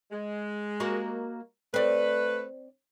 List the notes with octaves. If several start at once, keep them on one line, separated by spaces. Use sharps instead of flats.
G#3
A#3 F#4 D#5
A3 C4 B4 D5